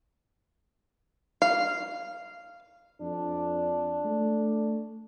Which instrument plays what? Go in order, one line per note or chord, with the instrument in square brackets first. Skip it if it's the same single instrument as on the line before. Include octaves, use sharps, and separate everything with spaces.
[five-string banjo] F5
[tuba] F2 [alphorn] D4
[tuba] A3